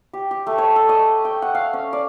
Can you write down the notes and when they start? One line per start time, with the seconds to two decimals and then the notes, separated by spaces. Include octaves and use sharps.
0.13 G4
0.31 G4
0.47 A3
0.58 C#5
0.76 A4
0.89 D#5
1.25 G5
1.42 F#5
1.55 F5
1.73 C#4
1.93 D5